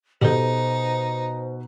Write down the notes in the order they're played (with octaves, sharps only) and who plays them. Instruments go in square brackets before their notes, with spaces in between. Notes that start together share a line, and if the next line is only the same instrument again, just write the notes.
[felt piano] B2 [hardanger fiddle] D#4 [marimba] G4 A4 [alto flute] C5